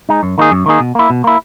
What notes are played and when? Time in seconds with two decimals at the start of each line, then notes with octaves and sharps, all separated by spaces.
0.09 G#3 D#4
0.23 F#2
0.38 D#3 A#3 D#4 G#4
0.51 F#2
0.66 D#3 A#3 D#4 G#4
0.80 B2
0.95 A#3 E4
1.10 B2
1.24 A#3 E4